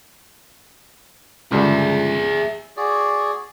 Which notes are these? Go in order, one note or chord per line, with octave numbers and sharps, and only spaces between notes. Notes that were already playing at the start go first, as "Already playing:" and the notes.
C#2 G2 D3 G#4 E5
F#4 G#4 D5